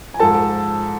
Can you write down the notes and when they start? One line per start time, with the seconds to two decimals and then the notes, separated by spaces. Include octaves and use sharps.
0.14 G#5
0.19 G#2 F3 A4 A5